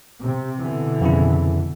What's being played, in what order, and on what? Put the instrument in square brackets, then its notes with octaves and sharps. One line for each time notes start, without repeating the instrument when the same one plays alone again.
[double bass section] C3
B2 D3 E3
[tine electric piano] F2 C#3 E4